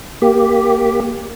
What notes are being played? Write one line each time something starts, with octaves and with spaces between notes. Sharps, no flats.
A#3 G4